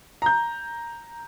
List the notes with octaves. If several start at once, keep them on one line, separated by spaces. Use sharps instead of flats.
A#5 G6